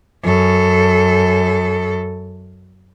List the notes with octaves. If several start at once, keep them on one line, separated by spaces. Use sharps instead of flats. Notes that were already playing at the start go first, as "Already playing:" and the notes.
F#2 A4